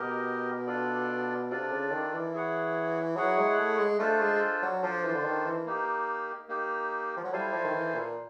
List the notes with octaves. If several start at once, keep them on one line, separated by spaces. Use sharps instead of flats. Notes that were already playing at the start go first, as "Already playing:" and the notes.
Already playing: B2 G4 A#4 D#5
D4 F4 A4 D5
C3 D4 F4 A4 D5
C#3
D#3
E3
E4 G#4 C#5 F#5
F#3 E4 G#4 C#5 F#5
G#3
A3
G#3
A3 D4 F4 A4 C5
G#3
F#3
F3 D4 F4 A4 C5
E3
D3
D#3
E3
A#3 D#4 G4
A#3 D#4 G4
F3
F#3
G3 E4 A4 C5 F5 G#5
F3
D#3
E3
A#2